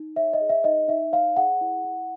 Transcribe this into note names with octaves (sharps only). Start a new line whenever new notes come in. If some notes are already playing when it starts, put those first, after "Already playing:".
Already playing: D#4
C#5 E5
D#5
G#4
E5
D#4 D#5
D#4 E5
C#5 F5
G#4 F#5
E4
E4